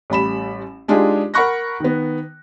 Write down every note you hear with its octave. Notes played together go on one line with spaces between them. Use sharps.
A1 G3 B5 E7
G#3 D4 D#4 F4 G4 G#4
A#4 F#5 B5 C#6 F#6 A#6
D#3 B3